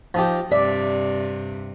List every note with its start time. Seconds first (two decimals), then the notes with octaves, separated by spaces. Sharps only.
0.14 F3 D#4 G4
0.52 G2 C3 D5 E5